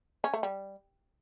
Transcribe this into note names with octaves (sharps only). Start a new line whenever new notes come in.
C#4
A3
G3